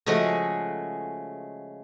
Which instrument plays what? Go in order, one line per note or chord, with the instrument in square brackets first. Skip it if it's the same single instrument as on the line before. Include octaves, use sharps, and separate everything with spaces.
[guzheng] C#3 F3 G#3 A3 F#4